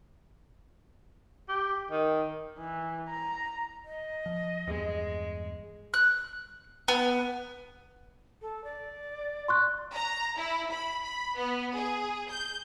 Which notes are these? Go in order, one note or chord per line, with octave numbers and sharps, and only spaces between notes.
G4
D#3
E3
A#5
D#5
F3
E2 G2 G#3
F#6
B3
A4
D5
C6 C#6 F#6
A#5
E4
B5
B5
B3
G#4
G6